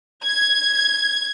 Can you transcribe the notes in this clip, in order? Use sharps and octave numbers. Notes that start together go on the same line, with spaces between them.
G#6